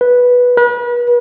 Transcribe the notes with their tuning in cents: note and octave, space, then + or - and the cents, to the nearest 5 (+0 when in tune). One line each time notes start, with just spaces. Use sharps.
B4 -5
B4 -35